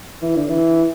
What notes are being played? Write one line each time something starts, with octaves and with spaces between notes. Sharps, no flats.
E3
D3
E3